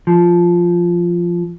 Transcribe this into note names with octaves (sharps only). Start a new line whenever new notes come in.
F3